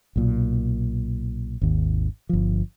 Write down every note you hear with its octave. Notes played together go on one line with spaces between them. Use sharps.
B1 A#2
G#1 D#2
G1 F3